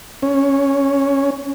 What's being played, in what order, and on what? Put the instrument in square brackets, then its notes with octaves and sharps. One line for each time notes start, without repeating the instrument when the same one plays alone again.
[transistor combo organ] C#4